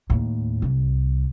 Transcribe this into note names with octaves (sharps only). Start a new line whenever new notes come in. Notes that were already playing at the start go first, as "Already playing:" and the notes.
D#2 A2
C2 G3